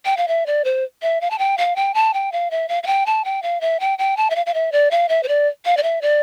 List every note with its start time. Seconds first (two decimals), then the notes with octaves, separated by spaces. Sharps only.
0.05 G5
0.17 F5
0.28 E5
0.46 D5
0.64 C5
1.02 E5
1.21 F5
1.30 A5
1.38 G5
1.57 F5
1.76 G5
1.94 A5
2.13 G5
2.32 F5
2.51 E5
2.68 F5
2.83 F5
2.87 G5
3.06 A5
3.25 G5
3.42 F5
3.61 E5
3.80 G5
3.98 G5
4.17 A5
4.30 E5
4.35 F5
4.46 F5
4.54 E5
4.72 D5
4.91 F5
5.09 E5
5.23 C5
5.28 D5
5.65 F5
5.77 D5
5.83 E5
6.01 D5